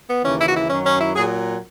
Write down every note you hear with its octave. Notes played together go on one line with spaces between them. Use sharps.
B3
D#2 C#3 E3 C#4
E4
F#4
E4
F#2 D#3 F#3 C#4
C#4
E4
A#2 F#3 G#4